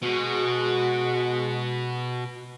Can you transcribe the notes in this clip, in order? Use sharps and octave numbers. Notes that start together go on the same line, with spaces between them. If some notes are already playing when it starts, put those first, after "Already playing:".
B2 G#3 F#4